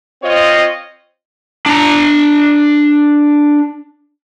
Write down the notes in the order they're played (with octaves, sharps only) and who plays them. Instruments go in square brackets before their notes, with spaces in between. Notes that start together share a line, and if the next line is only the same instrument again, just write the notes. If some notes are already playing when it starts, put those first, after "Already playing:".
[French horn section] C4 F4 C5 C#5 D#5
[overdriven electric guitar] D4 A#5